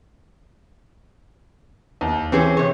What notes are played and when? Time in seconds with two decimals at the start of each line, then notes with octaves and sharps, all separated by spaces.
2.01 D#2
2.32 E3 C4 C#4 G#4
2.57 C3 C#5